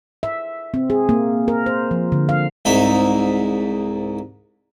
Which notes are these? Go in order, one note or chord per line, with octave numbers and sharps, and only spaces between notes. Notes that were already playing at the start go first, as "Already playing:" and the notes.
E5
C4
G#4
A#3
A#4
C5
F3
D3
F5
C2 G#2 D#4 E5